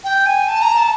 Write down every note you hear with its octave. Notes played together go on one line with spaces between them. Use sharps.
G5
G#5
A5
A#5
A5